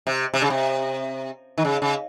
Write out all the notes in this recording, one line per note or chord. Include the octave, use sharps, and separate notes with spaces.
C3
C3
C#3
C3
D#3
C#3
C#3